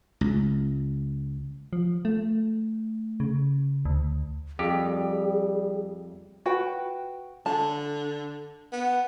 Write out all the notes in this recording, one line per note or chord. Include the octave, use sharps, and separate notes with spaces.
C#2
F3
A3
C#3
D2
F2 G3 G4 G#4
F#4 B4 G5
D3 A5
B3